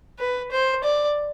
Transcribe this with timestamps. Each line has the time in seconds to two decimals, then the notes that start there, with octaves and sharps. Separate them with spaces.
0.19 B4
0.51 C5
0.84 D5